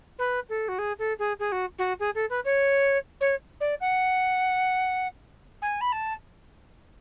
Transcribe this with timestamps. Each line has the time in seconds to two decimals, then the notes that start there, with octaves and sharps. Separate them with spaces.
0.18 B4
0.49 A4
0.68 F#4
0.78 G#4
0.98 A4
1.18 G#4
1.39 G#4
1.51 F#4
1.78 F#4
1.99 G#4
2.14 A4
2.29 B4
2.44 C#5
3.20 C#5
3.60 D5
3.80 F#5
5.61 G#5
5.80 B5
5.92 A5